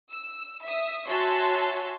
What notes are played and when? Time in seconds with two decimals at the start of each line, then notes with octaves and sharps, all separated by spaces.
0.11 E6
0.63 E5 D#6
1.08 F#4 C#5 E5 G#5 A5 C6